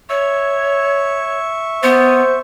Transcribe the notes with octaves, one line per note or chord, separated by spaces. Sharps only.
C#5 E5 C#6
B3 C5